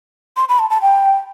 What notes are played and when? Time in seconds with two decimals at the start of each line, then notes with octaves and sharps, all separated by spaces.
0.37 C6
0.49 B5
0.59 A5
0.70 A5
0.82 G5